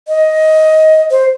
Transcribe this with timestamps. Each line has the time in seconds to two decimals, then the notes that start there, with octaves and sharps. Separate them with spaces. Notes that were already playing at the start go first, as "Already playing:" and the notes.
0.08 D#5
1.11 C5